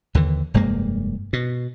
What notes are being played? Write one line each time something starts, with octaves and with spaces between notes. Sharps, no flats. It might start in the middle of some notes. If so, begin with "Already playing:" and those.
D#2 D3 E3
F1 G2 G#3 A#3
B2